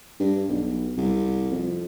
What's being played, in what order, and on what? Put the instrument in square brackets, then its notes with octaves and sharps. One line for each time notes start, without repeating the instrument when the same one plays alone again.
[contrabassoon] G2
B1
C2
F2